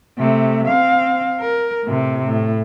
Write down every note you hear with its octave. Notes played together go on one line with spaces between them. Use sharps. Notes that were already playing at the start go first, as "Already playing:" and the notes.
C3 A3
C4 F5
A#4
A2 C3
A2